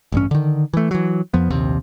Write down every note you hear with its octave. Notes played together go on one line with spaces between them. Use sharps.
A1 G2 C#4
D3 D#3
E3 A3
E3 F#3
F2 F3 B3
A#1 D#2 C3